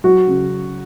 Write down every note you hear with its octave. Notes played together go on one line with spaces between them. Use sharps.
F#3 F#4
C#3